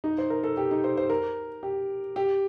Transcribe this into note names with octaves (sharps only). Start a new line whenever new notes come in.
D#4
C5
A#4
A4
G4
D#4
C5
C5
A#4
G4
G4